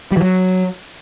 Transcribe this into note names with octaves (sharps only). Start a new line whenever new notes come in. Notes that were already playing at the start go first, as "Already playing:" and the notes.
G3
E3
F#3